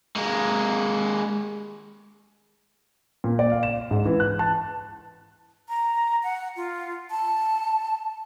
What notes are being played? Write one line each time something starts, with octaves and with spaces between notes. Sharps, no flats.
G#3 A#3
A#2
D5
F5
E7
G#2
E3
F#6
A5
A#5
F#5
F4
A5